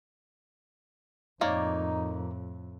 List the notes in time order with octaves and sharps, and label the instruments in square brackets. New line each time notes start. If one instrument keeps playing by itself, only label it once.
[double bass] F2 A2 [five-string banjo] A#3 C#5 D5 [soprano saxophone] D#4